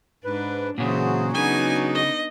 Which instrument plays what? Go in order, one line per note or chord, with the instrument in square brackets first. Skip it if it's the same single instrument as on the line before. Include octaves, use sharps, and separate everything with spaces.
[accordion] G#2 B4 [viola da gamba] D4
[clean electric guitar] A#2 C#3 [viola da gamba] E3 C5 [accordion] F#3 F#4 G#4
[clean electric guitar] C#3 [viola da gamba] B3 D4 D#4 [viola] G#5
[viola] D#5